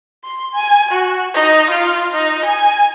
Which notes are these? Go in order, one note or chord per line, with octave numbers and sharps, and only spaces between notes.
C6
G#5
F#4
D#4
F4
D#4
G#5